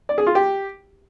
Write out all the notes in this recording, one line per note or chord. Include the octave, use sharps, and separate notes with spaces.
D5
G#4
F4
G4